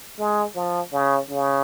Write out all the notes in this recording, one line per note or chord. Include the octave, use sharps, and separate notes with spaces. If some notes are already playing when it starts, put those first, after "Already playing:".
G#3
F3
C#3
C#3